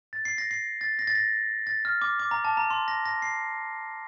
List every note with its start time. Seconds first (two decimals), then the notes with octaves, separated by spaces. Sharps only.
0.13 A6
0.25 C7
0.38 A#6
0.51 C7
0.81 A6
0.99 A#6
1.07 A6
1.15 A#6
1.67 A6
1.85 F6
2.02 D6
2.19 D6
2.31 A#5
2.45 A5
2.57 A#5
2.70 C6
2.88 A#6
3.05 A#6
3.22 C7